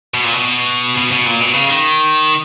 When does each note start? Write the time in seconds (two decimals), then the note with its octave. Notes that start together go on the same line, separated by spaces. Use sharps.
0.14 B2
0.24 A#2
0.33 B2
0.98 B2
1.12 B2
1.27 A#2
1.40 B2
1.54 C#3
1.69 D#3